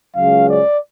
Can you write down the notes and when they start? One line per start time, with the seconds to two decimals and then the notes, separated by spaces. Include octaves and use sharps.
0.15 C#2 C#3 F#3 C#4 F5
0.48 D5